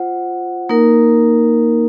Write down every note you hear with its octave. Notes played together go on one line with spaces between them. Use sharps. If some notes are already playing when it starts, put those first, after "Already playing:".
Already playing: F4 C5 F#5
A#3 D#4 A#4